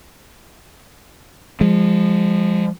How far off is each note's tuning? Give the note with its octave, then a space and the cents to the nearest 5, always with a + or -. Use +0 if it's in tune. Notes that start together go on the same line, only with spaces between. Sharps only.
F3 +0 G#3 -30